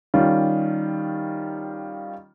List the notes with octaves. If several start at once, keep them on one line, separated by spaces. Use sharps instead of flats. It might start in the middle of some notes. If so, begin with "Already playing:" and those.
D#3 G3 C#4 F4